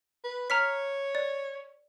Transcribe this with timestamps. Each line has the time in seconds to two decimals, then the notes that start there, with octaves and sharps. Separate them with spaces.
0.24 B4
0.50 C#5 A#5 F6 B6
1.15 D5